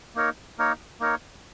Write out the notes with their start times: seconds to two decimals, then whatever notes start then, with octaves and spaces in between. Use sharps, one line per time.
0.15 A#3 D#4 A#4 C#5
0.58 A#3 D#4 A#4 C#5
1.00 A#3 D#4 A#4 C#5